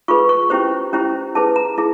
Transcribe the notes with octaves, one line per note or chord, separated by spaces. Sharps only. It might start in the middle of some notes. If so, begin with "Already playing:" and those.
F4 G#4 B4 C#6
C#6
C#4 E4 G4 C5
C#4 E4 G4 C5
E4 G#4 B4 A5
A#5
E4 G#4